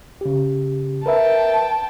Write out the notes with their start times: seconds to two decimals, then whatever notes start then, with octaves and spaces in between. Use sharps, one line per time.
0.21 C#3 G4
1.06 A#4 B4 E5 G5 A5